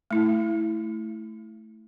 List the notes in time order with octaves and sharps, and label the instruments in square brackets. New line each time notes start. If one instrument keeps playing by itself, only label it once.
[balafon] A3 E4